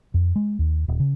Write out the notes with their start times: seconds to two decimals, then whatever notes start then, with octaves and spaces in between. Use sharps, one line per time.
0.14 F2
0.36 G#3
0.59 D#2
0.88 D#1
1.00 C#3